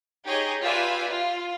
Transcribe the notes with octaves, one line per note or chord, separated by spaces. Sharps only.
D#4 G4 G#4 C#5 D#5
F4 G4 B4 D5 E5 G#5
F4